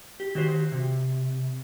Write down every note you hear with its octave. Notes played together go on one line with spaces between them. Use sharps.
G4
D#3 F#4 G4 C5
C3